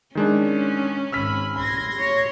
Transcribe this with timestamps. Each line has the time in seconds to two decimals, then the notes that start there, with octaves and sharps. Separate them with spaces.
0.15 D#3 G#3 C#4 D4
1.12 G#1 G#5 B5 E6 F6 B6
1.56 B5 C6 G#6 A#6
1.99 C#5